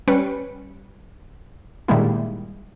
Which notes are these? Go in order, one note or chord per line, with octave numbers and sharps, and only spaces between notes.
G3 C#4 B4 C#7
A#2 D#3 G3 G#3 A#3 E4